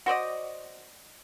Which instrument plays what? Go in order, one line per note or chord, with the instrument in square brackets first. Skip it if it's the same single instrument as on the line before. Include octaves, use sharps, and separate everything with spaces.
[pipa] F#4 C5 D5 D#5